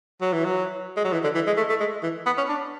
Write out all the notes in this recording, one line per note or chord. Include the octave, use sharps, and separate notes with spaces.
F#3
E3
F#3
G#3
F#3
E3
D3
E3
G#3
A3
A3
G#3
E3
B3
C#4
D4